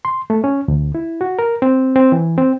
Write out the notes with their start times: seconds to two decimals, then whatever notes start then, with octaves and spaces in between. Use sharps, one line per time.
0.05 C6
0.30 A3
0.44 C#4
0.68 D2
0.95 E4
1.21 F#4
1.39 A#4
1.62 C4
1.96 C4
2.12 E3
2.38 C4